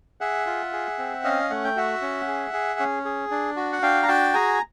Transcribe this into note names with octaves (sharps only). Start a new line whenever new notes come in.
G#4 E5 F#5
F4
G#4
C4
C#4 D#5 F5
A3 F#5
G5
F#4 E5 F#5
C#4
G#4
G#4
C#4
G#4
D4
F#4
F#5
D4 F5 G5
A#5
F#4 G5 A5
G#4 G#5 A#5